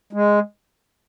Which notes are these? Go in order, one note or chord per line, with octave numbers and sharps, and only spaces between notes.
G#3